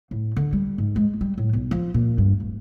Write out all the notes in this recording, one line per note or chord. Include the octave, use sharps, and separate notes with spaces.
A2
D3
G3
G#2
G#3
G3
A2
B1
F3
A#2
G2
D1